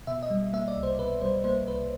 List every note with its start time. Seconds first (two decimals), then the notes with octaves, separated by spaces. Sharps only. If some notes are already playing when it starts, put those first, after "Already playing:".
0.07 B2 E5
0.23 D#5
0.30 G3
0.53 A#3 E5
0.68 D5
0.76 C2
0.83 C5
0.98 B2 B4
1.21 G3 C5
1.44 A#3 C5
1.67 C2 B4